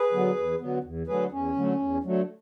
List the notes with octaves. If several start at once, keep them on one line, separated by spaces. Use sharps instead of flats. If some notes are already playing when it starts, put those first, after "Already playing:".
Already playing: G#4 B4
D3 F#3 B3
E2
D3 F#3 B3
E2
D3 F#3 A3 G#4 B4
E2 C#4
D3 F#3 A3
E2
D3 F#3 A3